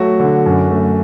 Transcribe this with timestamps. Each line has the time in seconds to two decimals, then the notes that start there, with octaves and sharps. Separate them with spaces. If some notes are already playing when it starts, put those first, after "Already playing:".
Already playing: F#3 A3 F#4
0.20 D3
0.46 F#2
0.71 A3